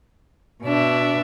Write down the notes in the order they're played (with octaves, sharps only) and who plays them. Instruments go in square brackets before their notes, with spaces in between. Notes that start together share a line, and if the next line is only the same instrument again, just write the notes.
[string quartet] B2 D4 E5